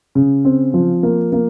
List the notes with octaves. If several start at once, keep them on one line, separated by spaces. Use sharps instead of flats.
C#3
C4
F3
A#3
A#3